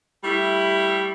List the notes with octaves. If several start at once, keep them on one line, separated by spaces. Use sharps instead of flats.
G3 A3 E4